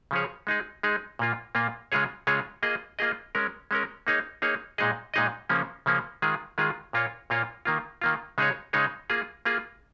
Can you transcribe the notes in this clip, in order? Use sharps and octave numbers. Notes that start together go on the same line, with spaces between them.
C#3 F3 C#4 G#4 C#5
G#3 D#4 G#4
G#3 D#4 G#4
A#2 A#3 F4
A#2 A#3 F4
C#3 G#3 F4 G#4 C#5
C#3 G#3 F4 G#4 C#5
A#3 F4 G#4 D#5
A#3 F4 G#4 D#5
G#3 C#4 A#4
G#3 C#4 A#4
A#3 D#4 G#4 C#5
A#3 D#4 G#4 C#5
A#2 G#3 D#4 G#4 D#5
A#2 G#3 D#4 G#4 D#5
C#3 F3 A#3 C#4
C#3 F3 A#3 C#4
D#3 G#3 F4 G#4
D#3 G#3 F4 G#4
A#2 A#3 F4 C#5
A#2 A#3 F4 C#5
D#3 A#3 F4
D#3 A#3 F4
C#3 G#3 D#4 G#4 C#5
C#3 G#3 D#4 G#4 C#5
A#3 F4 G#4
A#3 F4 G#4